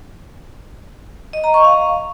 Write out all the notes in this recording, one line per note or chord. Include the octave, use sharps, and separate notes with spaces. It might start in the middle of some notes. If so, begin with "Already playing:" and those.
D#5
A#5
C#6
F5